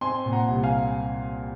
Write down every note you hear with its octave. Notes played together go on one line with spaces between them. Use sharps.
C4 G#5 C6
A#2
F#5 A#5
C2
F5 G#5